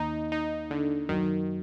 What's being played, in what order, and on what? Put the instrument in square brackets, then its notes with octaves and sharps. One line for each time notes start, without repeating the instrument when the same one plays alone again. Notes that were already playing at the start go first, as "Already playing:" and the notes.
Already playing: [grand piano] D#2 D#3 [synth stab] D#4
[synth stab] D#4
D3
[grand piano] F#2 F#3 [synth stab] D#3